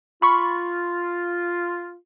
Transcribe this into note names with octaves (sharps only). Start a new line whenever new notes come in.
F4 B5 C#6